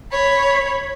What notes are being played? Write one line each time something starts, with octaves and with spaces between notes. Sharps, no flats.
C#5 B5